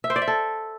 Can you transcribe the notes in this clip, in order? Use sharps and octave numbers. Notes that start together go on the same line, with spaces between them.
E5
C5
D5
E5
A4